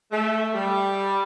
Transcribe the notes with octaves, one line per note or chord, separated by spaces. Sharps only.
A3
G3